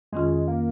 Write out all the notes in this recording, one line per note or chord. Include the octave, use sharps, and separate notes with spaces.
F2 D#3 G#3 C#4 F4
A#3